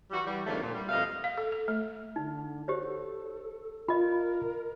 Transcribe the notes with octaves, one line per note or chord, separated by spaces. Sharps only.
E3 G3 F#4
E3 G3
F2 G#2 D3 F#3 A3 A#3
A#2
G3
F2 B2 A3 D#5 F5
F5
A4
A4
A3
D3 D#4
F#4 G4 C5 C#5
A4
F4 A#4 D#5 B5